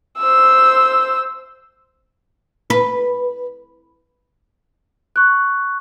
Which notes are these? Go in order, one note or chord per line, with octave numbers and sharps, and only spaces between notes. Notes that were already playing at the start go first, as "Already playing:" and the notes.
C5 E6
B4
C#6 F#6